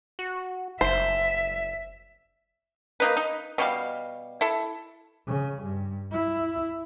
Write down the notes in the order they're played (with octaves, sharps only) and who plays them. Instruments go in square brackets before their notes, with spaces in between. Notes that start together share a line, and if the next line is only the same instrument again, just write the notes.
[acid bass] F#4
[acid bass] F#1 [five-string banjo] C5 [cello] E5
[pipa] A#3 D#4 B4
D#4
B2 G3 F5
E4 A4
[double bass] C#3
G2
E4